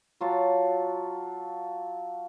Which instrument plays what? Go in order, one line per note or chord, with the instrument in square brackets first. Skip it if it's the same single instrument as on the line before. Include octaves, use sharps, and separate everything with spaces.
[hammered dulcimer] F#3 F4 A5